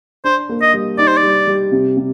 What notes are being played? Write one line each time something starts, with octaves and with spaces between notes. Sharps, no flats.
D4 C5
A#3
D#5
G3
D#4 D5
C5
D5
G3
G3
C3
C3